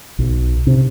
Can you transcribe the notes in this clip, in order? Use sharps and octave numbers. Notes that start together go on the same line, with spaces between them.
B1
C3